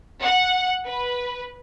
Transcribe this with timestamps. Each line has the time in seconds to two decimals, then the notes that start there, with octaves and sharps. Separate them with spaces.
0.21 F#5
0.87 B4